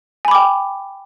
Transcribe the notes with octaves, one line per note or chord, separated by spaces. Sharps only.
G5 G#5 B5 D6